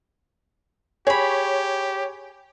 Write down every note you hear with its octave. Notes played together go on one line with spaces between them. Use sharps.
G4 G#4 C#5 B5